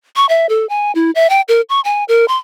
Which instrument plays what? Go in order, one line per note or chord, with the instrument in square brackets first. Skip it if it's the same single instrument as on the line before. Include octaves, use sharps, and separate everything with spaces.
[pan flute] C#6
E5
A4
G#5
E4
E5
G5
A#4
C#6
G#5
A#4
C6